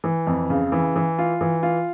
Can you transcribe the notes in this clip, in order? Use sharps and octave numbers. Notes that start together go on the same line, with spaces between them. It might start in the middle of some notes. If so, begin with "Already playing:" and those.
E3
F2
C#3
E3
E3
F4
E3
F4